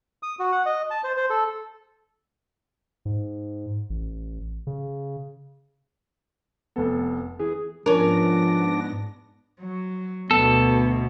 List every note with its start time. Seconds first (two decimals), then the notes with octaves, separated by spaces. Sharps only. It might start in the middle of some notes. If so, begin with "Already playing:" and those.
0.23 D#6
0.39 F#4
0.52 F#5
0.66 D#5
0.91 A5
1.04 C5
1.17 C5
1.30 A4
3.05 G#2
3.90 A1
4.67 C#3
6.76 F1 B3 A4
7.39 E3 G#4
7.86 G#2 F3 B3 C#4 D4 A#4 A#6
9.60 F#3
10.31 D2 B2 B3 A4